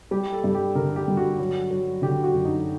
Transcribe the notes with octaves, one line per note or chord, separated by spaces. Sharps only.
G3 G4
A4
G2
G4
D3 A#4
G4
G2
F#4
F#3
F#3
D3 G4
F#4
F#2
D#4